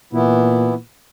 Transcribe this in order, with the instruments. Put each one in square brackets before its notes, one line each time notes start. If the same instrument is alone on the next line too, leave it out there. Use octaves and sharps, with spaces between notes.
[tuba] A#2 [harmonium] E3 B3 E4